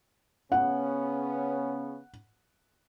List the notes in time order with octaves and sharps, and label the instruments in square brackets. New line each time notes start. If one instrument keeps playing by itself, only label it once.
[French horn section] C#3 B3 C#4 [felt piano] F#5